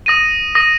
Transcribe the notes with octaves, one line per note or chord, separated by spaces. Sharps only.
D#6 A#6 D#7
D#6 A#6 D#7